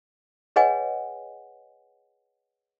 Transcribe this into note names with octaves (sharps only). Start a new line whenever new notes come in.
G#4 B4 C#5 D#5 F#5 G#5